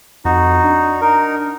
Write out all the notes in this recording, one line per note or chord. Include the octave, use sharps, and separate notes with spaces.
F2 D#4 F#4
D4
D#4 A#4